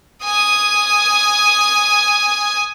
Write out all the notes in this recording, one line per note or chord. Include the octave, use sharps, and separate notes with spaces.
G#5 D#6